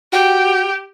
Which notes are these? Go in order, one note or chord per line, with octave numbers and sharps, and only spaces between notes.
F#4 G4 G5